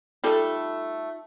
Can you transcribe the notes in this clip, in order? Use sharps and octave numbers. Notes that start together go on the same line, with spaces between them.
G3 A3 D#4 F4 A4